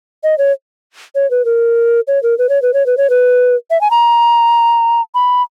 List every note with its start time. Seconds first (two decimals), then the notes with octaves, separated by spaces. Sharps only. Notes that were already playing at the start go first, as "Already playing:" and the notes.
0.23 D#5
0.38 C#5
1.15 C#5
1.31 B4
1.45 A#4
2.07 C#5
2.23 A#4
2.38 B4
2.49 C#5
2.62 B4
2.74 C#5
2.86 B4
2.97 C#5
3.10 B4
3.71 E5
3.81 G#5
3.91 A#5
5.15 B5